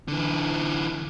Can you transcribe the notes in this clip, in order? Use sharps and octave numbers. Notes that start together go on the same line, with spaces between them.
D3 E3